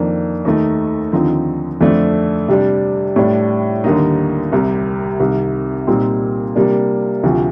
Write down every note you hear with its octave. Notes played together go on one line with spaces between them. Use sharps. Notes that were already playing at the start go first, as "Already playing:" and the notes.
Already playing: F2 D#3 A#3 D4
D#2 D#3 A3 D#4
D#2 D3 F3 C4 D#4
F2 D3 A3 D4
C3 G3 D4
A2 G3 D4
D#2 D3 G3 A#3 D#4
C2 C3 G3
C2 C3 D#3
A#2 G3 C4 D#4
C3 G3 A#3 D4
D2 C3 F3